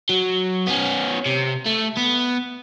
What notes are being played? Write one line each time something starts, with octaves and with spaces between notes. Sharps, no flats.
F#3
B3 C#4
C3
A3
B3